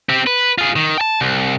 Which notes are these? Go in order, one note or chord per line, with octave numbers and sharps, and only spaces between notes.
C4 G4
B4
F4 G#4
D#3
G5 A5
C2